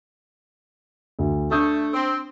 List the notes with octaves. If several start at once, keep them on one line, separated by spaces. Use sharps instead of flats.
D2
A3 D4 D#6 G6
C4